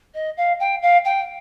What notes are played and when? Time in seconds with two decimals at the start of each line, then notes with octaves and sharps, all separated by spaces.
0.14 D#5
0.37 F5
0.60 G5
0.82 F5
1.05 G5